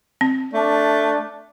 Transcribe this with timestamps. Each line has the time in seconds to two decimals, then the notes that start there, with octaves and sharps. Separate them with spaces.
0.21 C4
0.54 A3 D4